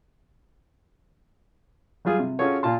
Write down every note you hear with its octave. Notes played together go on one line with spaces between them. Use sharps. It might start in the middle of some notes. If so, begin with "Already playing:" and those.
F#3 G3 F4 G#4
C3
C#4 F4 F#4 G#4 A4 C#5
A#2 F4 A5 C6